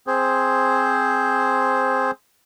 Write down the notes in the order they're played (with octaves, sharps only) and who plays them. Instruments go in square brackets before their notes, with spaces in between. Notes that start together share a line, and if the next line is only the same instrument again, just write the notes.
[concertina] C4 G#4 C5